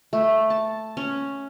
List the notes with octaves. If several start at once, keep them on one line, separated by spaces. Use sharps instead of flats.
A3
A5
C#4